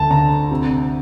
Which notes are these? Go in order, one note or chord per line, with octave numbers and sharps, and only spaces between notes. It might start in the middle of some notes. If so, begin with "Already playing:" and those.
Already playing: D2 A5
D3 A#5
C3